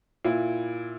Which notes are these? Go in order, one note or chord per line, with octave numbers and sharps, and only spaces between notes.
A#2 E4